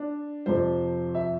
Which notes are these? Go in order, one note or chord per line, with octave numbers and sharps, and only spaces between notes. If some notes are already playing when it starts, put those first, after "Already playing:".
Already playing: D4
F2 C3 F3 C5
E5